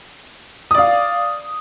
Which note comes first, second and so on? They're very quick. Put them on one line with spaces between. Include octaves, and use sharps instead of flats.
D#6 D5 F5